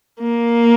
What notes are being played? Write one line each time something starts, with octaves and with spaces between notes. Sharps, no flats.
A#3